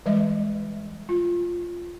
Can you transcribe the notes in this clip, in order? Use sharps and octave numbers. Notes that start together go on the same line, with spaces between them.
E3 G3 G#3 D#5 E5
F4